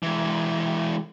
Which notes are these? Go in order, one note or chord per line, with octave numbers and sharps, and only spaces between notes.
E3 G#3